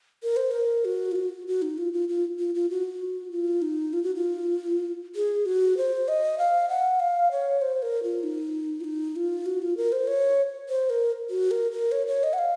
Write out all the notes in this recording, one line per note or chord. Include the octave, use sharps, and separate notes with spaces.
A#4
C5
A#4
F#4
F4
F#4
F#4
D#4
F4
F4
F4
F4
F4
F#4
F4
D#4
F4
F#4
F4
G#4
F#4
C5
D#5
F5
F#5
F5
C#5
C5
A#4
F4
D#4
F4
D#4
F4
F#4
F4
A#4
C5
C#5
C5
A#4
F#4
A#4
A#4
C#5
C#5
D#5
F#5
F5